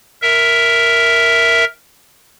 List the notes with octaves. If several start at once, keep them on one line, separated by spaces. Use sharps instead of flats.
A#4 E5